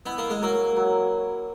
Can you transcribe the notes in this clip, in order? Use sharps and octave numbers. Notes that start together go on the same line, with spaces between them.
B3 E4
A#3
G#3
F#3 A#3
F#3